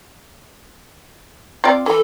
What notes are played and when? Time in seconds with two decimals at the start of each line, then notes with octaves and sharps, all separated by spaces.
1.64 C4 F4 D5
1.86 E3 A4